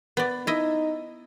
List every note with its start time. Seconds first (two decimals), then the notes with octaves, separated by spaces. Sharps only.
0.17 B3 D5
0.47 D#4 E4 D#5